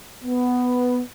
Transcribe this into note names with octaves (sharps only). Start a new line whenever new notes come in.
B3